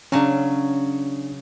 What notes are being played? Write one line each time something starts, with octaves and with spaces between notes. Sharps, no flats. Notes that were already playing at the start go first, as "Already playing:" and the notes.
C#3 F#3 C#4 D4